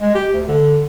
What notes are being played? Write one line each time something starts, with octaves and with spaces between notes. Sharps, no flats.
G#3
G4
D2
D3